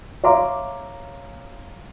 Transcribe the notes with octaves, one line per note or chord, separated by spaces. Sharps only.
C#5 E5 F5 A#5 C6 D6